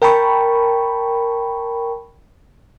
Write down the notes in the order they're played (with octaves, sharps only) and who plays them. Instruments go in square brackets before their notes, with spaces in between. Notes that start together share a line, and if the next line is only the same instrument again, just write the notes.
[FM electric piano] A#4 G5 A5 B5 C#6